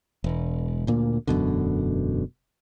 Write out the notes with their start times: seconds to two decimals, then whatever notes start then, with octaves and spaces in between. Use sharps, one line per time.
0.24 E1
0.87 D2 A#2 A#3
1.27 E1 F#2 B2 D3